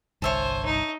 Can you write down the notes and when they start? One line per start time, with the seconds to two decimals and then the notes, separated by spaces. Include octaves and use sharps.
0.22 G1 C2 G2 C5 C#5 E5 G#5 A5
0.65 D#4